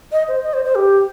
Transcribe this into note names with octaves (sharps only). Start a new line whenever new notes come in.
D#5
C5
D#5
C5
C5
G4